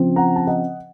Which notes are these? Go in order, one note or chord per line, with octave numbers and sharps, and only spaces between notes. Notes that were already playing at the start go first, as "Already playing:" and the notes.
Already playing: C#3 F3 C4
F#5 A#5
A5
D#5 F#5